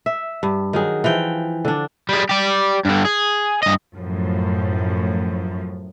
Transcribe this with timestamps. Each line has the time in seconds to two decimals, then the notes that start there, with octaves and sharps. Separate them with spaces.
0.06 E5
0.43 G2
0.73 D#3 F#3 G#4
1.04 E3 F3 G5
1.65 D3 D4
2.09 G3 G#4
2.29 G4 D5
2.85 G2 D3
3.05 G#4
3.63 G2 D#5
3.96 F#2 A2 F3